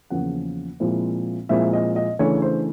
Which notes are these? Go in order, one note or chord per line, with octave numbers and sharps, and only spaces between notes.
E2 C#3 F3 A#3 C#4 F#5
A#2 F3 G#3 C4 E4
A#2 F3 G#3 C4 E4 E5
D#5
D#5
C#3 E3 A3 D4 C#5
C5